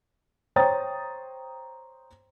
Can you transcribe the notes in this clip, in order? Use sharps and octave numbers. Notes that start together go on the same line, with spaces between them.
C5 C#5 G5 A#5 D#6 A6